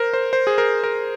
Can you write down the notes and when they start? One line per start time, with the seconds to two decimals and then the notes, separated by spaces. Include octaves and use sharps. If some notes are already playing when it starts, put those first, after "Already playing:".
Already playing: A#4 C5
0.13 C5
0.33 C5
0.47 G#4
0.58 A#4
0.84 A#4